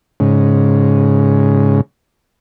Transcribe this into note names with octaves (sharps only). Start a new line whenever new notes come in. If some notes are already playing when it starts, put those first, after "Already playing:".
G#2 C#3